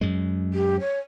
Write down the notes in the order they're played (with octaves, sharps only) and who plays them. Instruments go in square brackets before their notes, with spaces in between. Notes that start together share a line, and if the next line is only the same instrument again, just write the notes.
[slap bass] F#2 G#3
[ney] G4
C#5